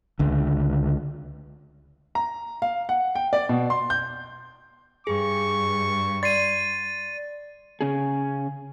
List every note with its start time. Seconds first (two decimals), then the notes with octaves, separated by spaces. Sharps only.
0.19 C#2 D3
2.15 A#5
2.62 F5
2.89 F#5
3.15 G5
3.33 D5
3.49 B2
3.70 C6
3.90 G6
5.07 G2 G#4 C#6
6.23 D5 C6 A6 C7 D#7
7.81 C#3 C#4 G#4